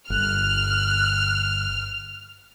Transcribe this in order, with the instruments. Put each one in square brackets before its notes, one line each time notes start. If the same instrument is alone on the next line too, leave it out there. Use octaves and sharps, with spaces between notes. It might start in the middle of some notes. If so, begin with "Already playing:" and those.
[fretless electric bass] G1 [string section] F6 [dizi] F#6